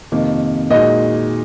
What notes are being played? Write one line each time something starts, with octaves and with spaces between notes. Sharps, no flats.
F2 C3 D#3 A#3
A#2 G#3 D#4 F#4 D#5